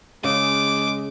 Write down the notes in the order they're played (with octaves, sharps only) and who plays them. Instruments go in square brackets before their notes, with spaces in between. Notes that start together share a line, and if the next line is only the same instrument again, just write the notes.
[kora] C#3 [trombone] G#3 [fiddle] D6